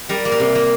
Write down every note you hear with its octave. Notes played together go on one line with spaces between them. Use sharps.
G3 A#4
A#3
A#4
C3
A#3